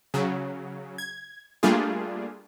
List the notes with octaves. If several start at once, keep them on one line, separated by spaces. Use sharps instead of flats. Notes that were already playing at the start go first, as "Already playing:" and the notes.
C#3 F#3
G#6
G3 A3 A#3 D4 F4 G#4